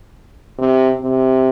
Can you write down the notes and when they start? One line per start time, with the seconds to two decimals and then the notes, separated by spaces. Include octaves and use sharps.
0.59 C3
1.01 C3